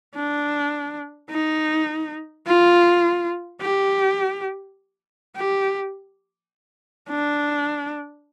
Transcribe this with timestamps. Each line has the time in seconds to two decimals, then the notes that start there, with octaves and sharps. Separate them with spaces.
0.16 D4
1.30 D#4
2.47 F4
3.62 G4
5.37 G4
7.10 D4